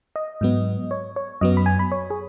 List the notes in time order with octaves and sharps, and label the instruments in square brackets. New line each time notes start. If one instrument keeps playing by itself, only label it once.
[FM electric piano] D#5
G#2 F#3 B3
C#5
C#5
F#2 F#3 B3 D#5
B5
G#5
B5
C#5
G#4